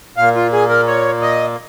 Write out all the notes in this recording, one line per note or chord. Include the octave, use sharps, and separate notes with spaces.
A#2 F5
A#3
F4
G#4
A#4
C#5
D#5